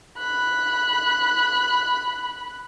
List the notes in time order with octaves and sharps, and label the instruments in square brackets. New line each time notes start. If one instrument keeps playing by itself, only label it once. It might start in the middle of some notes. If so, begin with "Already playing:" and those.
[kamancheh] B5 F#6